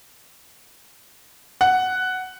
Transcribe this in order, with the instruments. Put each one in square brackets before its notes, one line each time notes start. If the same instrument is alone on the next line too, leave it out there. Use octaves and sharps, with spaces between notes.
[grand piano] F#5